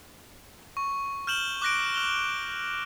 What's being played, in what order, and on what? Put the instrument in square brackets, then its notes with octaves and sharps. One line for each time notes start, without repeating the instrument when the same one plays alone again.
[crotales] C#6
F6 G6 E7 F#7 G7
D6 F#6 A#6 D7
F6 F7 G7